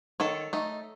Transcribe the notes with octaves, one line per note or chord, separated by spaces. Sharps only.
D#3 A4 C#5
A3 D#4